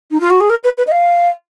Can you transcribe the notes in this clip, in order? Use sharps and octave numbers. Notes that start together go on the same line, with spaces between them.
D#4
F4
F#4
G#4
A#4
B4
B4
D#5
F5